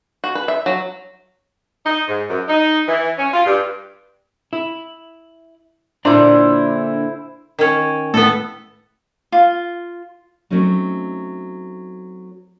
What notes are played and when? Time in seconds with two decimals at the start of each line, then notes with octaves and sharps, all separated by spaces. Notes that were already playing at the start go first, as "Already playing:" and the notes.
0.24 F#4
0.35 B4
0.48 E5
0.66 F#3
1.86 D#4
2.08 G#2
2.28 F#2
2.48 D#4
2.88 E3
3.18 C#4
3.33 F4
3.46 G2
4.53 E4
6.05 A#2 D3 D4 E4 C5 D5 A#5
7.59 D#3 C#4
8.14 A2 B3 A4
9.32 F4
10.50 F#3 A3 C4 C#4 D#4